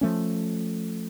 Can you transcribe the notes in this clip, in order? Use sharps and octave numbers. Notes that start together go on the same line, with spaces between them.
F3 A3 C#4